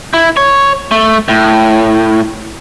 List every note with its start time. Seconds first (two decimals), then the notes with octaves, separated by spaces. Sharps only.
0.13 E4
0.37 C#5
0.91 A3
1.29 A2